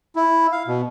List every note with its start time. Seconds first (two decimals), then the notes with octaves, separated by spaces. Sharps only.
0.16 E4
0.52 F5
0.67 B2